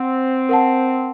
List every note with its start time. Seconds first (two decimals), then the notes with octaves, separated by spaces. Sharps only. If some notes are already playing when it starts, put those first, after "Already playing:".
Already playing: C4 F#5
0.49 A#4 F#5 A5